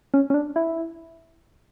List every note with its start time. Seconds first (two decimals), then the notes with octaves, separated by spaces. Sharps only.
0.14 C#4
0.30 C#4
0.34 D4
0.56 E4